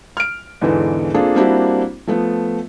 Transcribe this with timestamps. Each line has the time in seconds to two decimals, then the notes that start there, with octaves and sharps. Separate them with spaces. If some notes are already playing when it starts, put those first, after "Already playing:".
0.17 F6 D7
0.61 E2 G#2 D3 E3 B3
1.14 A#3 C4 D4 F4 G#4 A4
1.36 G3 A#3 C4 D4 E4 F#4
2.07 F3 A3 B3